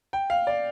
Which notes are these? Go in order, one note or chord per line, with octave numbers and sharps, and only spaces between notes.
G5
F5
D5